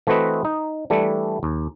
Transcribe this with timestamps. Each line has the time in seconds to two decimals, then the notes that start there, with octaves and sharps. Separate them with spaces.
0.07 E3 A3 C4 F#4 B4 D#5
0.45 D#4
0.90 E3 G3 A3 D4
1.43 D#2